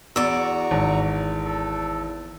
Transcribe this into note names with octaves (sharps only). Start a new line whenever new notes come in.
E2 F#4 D5 A#5 C#6 E6
G#1
A4